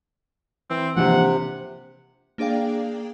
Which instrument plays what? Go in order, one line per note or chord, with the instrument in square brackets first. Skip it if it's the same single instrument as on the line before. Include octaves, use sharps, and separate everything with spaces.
[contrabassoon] E3 [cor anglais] C4
[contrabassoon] A#1 [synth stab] G#2 E3 F3 [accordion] C3 [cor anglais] F#5
[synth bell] A#3 D4 G#4 D5 F5 G5